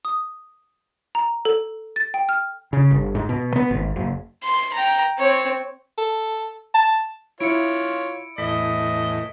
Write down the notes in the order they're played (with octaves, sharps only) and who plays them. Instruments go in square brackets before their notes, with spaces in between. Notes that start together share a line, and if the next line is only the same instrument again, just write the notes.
[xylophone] D#6
A#5
A4
A6
G5
F6
[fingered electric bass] C#3
G1
G#2
B2
B3
G#1
F#1
[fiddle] C6
G5 A#5
C4 C#5
[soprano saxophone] A4
A5
[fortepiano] E4 [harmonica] F4 C#5 [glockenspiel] C#7 D7
[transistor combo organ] E2 A2 [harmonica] D#5 [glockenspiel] B6